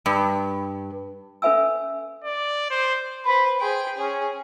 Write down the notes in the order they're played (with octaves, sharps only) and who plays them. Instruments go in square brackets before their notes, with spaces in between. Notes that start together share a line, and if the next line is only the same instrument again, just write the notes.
[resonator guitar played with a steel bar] G2
[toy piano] C#4 A4 B4 E5 G#5 E6
[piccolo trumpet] D5
C5
[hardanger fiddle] B4 C5 [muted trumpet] B5
[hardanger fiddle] G#4 G5 [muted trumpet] C5
[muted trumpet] C#4 [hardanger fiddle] G#4